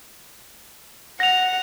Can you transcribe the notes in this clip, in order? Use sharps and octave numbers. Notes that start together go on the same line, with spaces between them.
F#5 A#6 F7